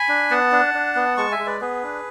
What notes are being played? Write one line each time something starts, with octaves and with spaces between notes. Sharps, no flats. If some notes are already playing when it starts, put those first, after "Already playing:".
Already playing: G#5 B5
D4
B3 F#5 A5
D4
D4
B3
G#3 A5 C#6
E5 G#5
G#3
B4 D5
B3 G#4 B4
D4